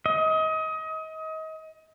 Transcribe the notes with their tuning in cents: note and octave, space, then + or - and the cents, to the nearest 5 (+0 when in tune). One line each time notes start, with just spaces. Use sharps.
D#5 +30